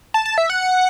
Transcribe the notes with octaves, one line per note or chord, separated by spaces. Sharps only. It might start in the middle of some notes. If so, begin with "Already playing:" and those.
A5
A5
E5
F#5